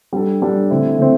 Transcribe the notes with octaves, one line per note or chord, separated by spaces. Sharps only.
G3 D4 A4
G3 D4 A4
D3 A3 C4 E4
D3 A3 C4